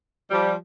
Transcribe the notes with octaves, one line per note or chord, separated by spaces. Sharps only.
F3 G3